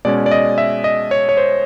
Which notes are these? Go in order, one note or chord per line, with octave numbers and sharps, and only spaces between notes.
B2 G#3 C#4 D5
D5
D#5
E5
D#5
C#5
C#5
C5